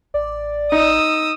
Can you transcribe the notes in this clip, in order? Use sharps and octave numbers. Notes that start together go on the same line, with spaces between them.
A1 D5
D#4 D#6 E6